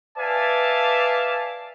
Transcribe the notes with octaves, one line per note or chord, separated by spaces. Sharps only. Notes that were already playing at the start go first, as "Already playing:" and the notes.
B4 D5 E5 F5 G#5 A5